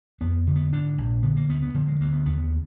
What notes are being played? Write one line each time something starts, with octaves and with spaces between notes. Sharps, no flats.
F2 B3
D3
B3
G#2 D4
A#1
D3 B3
A#3
D2 B3
B3
D3 F3
G#3
D2 A#3
B3
D#2 B3